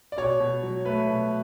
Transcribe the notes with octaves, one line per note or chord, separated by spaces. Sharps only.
D5
B2 C#5
B2
F#3
A3 B4
B2